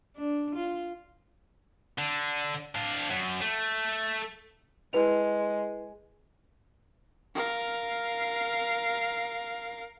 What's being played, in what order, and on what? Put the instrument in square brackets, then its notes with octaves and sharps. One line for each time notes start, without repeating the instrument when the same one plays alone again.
[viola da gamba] D4
F4
[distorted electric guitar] D3
D4 F5
F#2
A3
[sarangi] G#3 [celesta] E4 B4 F7
[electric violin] A#4 F5